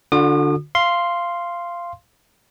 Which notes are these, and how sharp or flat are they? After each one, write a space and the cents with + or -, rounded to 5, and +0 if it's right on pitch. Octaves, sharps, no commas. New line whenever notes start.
D3 +0 F#4 -45 D#6 -45
F5 -15 C6 +0